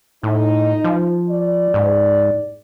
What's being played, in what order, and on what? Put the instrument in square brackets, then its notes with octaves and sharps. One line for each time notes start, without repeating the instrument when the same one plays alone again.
[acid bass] A2 [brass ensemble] D#4
[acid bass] F3
[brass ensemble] D5
[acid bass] G#2